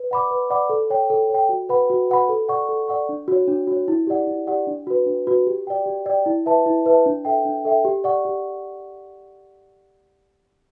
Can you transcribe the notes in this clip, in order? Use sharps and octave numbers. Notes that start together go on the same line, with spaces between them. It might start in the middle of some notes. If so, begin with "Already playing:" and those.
Already playing: B4
D5 F#5 B5 D6
B4
D5 F#5 B5 D6
A4
C#5 G5
A4
C#5 G5
F#4
B4 F#5 B5
F#4
B4 F#5 B5
A4
D5 F#5 C#6
A4
D5 F#5 C#6
D4
F#4 C#5
D4
F#4
C#5
E4
G4 D5 F#5
E4
G4 D5 F#5
D4
F#4 B4
D4
F#4 B4
G4
D5 G5
G4
D5 G5
E4
B4 E5 A5
E4
B4 E5 A5
D4
A4 E5 G5
D4
A4 E5 G5
G4
D5 F#5 C#6
G4